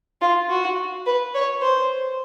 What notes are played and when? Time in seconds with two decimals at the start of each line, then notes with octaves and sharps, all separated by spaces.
0.21 F4
0.49 F#4
1.06 B4
1.34 C#5
1.62 C5